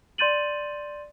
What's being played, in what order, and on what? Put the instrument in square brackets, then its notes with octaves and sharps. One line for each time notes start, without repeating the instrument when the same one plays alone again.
[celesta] D5 C6 G6 A6 D#7 F#7